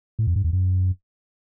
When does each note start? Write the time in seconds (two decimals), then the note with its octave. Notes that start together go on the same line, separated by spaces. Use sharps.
0.19 A2
0.27 F2
0.36 G2
0.44 E2
0.53 F#2